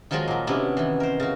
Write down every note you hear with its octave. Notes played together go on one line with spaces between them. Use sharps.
D#3 F3 F#3 G#3 F4 D#5
A#2 F#3
C3 B3 C#4 D4 E4
D#3 E3
A#4 C5
C#3 F#4